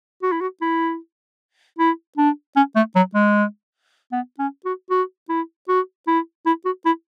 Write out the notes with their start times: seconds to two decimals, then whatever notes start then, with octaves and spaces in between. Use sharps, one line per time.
0.23 F#4
0.32 E4
0.41 F#4
0.62 E4
1.79 E4
2.18 D4
2.56 C#4
2.76 A3
2.96 F#3
3.15 G#3
4.12 B3
4.39 C#4
4.65 F#4
4.90 F#4
5.29 E4
5.68 F#4
6.07 E4
6.46 E4
6.65 F#4
6.85 E4